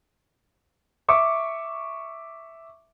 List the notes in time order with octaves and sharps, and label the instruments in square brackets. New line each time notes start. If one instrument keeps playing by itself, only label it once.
[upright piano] E5 C#6 D6